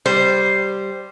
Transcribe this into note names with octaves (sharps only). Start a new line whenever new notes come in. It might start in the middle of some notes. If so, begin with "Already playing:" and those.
G3 C5